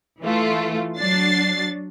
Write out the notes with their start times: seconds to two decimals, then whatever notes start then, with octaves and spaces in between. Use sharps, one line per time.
0.21 E3 A3 F4
0.98 F#3 D4 A6 C7